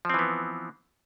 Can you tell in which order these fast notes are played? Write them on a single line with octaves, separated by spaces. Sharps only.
F3 C4 E3 B3